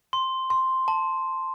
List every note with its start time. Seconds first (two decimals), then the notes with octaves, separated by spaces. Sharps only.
0.13 C6
0.50 C6
0.88 A5